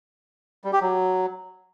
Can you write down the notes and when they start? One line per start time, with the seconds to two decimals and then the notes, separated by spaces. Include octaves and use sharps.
0.64 G3
0.73 G4
0.81 F#3